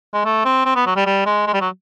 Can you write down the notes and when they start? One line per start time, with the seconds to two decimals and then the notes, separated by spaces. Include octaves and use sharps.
0.13 G#3
0.25 A3
0.45 C4
0.65 C4
0.76 B3
0.86 F#3
0.96 G3
1.06 G3
1.26 G#3
1.47 G#3
1.53 G3
1.61 F#3